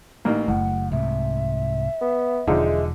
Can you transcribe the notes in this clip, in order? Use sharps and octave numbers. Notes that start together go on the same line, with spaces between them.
A1 A#3 D#4
F#1 A2 F#5
C2 G#2 C3 E5
B3
E1 D3 F3 G#3 D#4